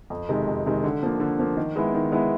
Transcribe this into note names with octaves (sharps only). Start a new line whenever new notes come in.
F2
C3 D#3 G#3
F2
C3 D#3 G#3
D3
F3 A#3
D3
F3 A#3
D#3
G#3 B3 E4
D#3
G#3 B3 E4